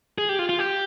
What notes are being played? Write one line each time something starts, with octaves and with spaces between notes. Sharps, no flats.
G#4
G4
F4
F4
G4